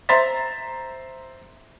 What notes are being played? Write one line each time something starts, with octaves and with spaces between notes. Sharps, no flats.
C5 E5 A#5 C6 A6 B6